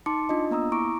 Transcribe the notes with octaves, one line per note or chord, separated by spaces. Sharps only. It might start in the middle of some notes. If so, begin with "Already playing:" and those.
D#4 A5 C6 D6 C#7
D4 F4 D#5
A#3 B3 A#5 D#6 E6
E4 A#5 C#6 D6 D7